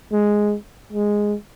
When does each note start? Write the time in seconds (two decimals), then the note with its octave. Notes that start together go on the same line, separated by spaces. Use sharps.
0.12 G#3
0.93 G#3